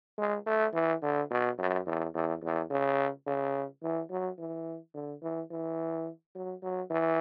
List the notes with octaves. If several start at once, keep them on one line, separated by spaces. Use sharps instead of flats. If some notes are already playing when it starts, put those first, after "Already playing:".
G#3
A3
E3
D3
B2
F#2
E2
E2
E2
C#3
C#3
E3
F#3
E3
D3
E3
E3
F#3
F#3
E3